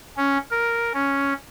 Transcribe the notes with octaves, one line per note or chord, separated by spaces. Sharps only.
C#4
A#4
C#4